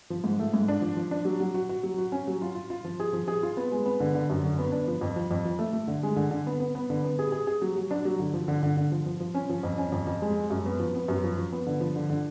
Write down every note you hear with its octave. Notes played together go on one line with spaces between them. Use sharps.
F3
G#2
A3
G#2
D4
F3
F3
D4
F#3
F#3
F#4
F#4
F#3
F#4
C#4
F#3
F4
F4
F4
F3
G#4
F3
G#4
F4
B3
G#3
B3
D3
D3
F#2
D3
B3
D4
F3
F2
F3
F2
F3
A3
A3
D3
G#3
D3
D3
B3
B3
B3
D3
B3
G#4
G#4
G#4
F#3
F#3
D4
F#3
D3
F3
D3
D3
D3
F3
F3
F3
C#4
F3
F2
C#4
F2
F2
G#3
G#3
F#2
B3
F3
B3
F#2
F3
F3
B3
D3
F3
D3
D3